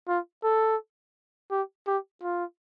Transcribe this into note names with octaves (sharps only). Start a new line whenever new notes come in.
F4
A4
G4
G4
F4